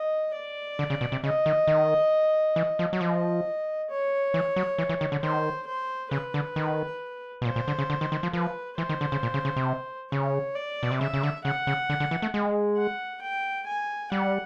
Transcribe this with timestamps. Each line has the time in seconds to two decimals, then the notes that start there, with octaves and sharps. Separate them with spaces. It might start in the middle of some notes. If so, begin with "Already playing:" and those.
Already playing: D#5
0.35 D5
0.79 D3
0.90 C#3
1.01 B2
1.12 C3
1.23 C#3 D#5
1.46 D#3
1.68 D#3
2.56 E3
2.79 F3
2.93 F#3
3.01 F3 D#5
3.90 C#5
4.34 E3
4.56 F#3
4.78 E3
4.89 E3
5.01 D#3
5.12 D3
5.22 D#3 C5
5.67 C5
6.11 C#3 B4
6.34 D3
6.56 D#3
7.42 B2
7.45 A#2 C5
7.56 A#2
7.68 D3
7.79 C#3
7.90 D3
8.01 D#3
8.12 D#3
8.23 F3
8.33 F3 B4
8.78 E3 C5
8.89 D#3
9.01 D3
9.12 C#3
9.23 A#2
9.34 C#3
9.45 C#3
9.56 C3
10.12 C#3 C#5
10.55 D5
10.83 B2
10.91 C3
11.01 C#3 E5
11.14 C#3
11.23 D3
11.44 C#3 F#5
11.67 C#3
11.90 D3
12.00 D3
12.11 E3
12.22 A3
12.34 G#3
12.78 F#5
13.22 G5
13.67 G#5
14.12 G3 F#5